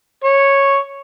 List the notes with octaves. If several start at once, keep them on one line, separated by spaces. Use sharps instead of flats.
C#5